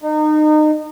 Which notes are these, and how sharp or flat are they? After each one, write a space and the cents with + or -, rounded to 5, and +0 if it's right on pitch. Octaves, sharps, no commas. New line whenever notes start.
D#4 -30